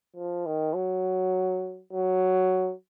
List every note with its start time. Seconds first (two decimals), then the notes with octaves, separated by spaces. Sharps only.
0.16 F3
0.46 D#3
0.75 F#3
1.93 F#3